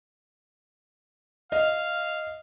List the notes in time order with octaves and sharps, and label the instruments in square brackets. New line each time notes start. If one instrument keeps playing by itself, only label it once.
[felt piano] D#5 [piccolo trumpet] F5